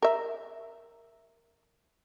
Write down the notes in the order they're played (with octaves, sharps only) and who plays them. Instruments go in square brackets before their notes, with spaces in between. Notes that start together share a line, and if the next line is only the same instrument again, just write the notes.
[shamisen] A#4 E5